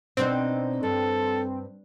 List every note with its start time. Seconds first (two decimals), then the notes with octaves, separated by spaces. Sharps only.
0.17 B2 C4 D4 D#4
0.83 G2 A4